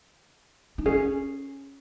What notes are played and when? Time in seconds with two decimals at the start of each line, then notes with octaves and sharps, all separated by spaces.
0.78 D#4
0.85 C#4 G#4